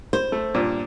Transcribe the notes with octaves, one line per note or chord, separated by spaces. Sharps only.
C5
A3
G2 A#2